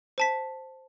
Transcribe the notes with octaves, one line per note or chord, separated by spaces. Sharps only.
C5 A5 B6